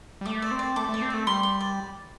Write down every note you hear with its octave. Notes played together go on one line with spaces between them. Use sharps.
G3
A3 D6
D5
C4
D5
A3 D6
A3 D5
C4
A3 D5
G3 C6
C6
D5